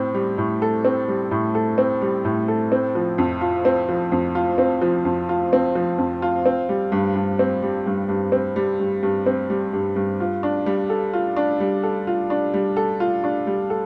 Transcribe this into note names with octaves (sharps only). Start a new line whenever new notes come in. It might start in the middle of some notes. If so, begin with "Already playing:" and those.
Already playing: A2 C4
G3
A2
A4
C4
G3
A2
A4
C4
G3
A2
A4
C4
F3
F2
F4
C4
F3
F2
F4
C4
F3
F2
F4
C4
F3
F2
F4
C4
G3
G2
G2
C4
G3
G2
G2
C4
G3
G2
G2
C4
G3
G2
G2
F4
D4
G3
A4
F4
D4
G3
A4
F4
D4
G3
A4
F4
D4
G3
A4